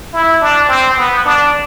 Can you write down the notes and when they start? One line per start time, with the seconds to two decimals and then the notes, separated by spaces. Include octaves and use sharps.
0.13 E4
0.41 D4
0.69 C4
0.97 B3
1.25 D4